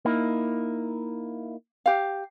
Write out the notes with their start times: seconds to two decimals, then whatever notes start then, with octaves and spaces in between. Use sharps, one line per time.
0.05 A#3 D#4 E4
1.86 G4 F5